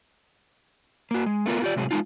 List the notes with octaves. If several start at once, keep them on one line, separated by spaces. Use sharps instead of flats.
A#3 F#4
G#3
A3 B3 F4 A#4
F4 G4 D5
A2 C3 F#3 G#3 G#4
G#3 D#4 F4